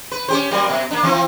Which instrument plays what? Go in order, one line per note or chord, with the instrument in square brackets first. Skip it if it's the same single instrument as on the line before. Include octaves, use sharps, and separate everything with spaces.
[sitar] B4
C#4 G4 C5
F#3 G3 A#3
B2
A#3 D4
E3 F3 C4